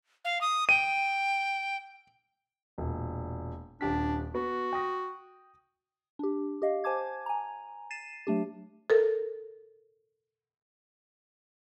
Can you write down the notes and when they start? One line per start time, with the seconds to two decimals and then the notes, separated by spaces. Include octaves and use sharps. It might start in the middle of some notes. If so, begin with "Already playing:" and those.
0.25 F5
0.41 D#6
0.69 G5 D#7
2.78 E1 A#2
3.81 D#1 D4 G4 B6
4.35 B3 F#4
4.73 G5 D#6 A#6
6.19 D4 G4
6.62 G4 D#5 F5
6.84 C5 G#5 A5 D6 G#6
7.26 G#5 A#5
7.90 A6 C7 D#7 E7
8.27 F#3 A3 D4 G4
8.90 A4 A#4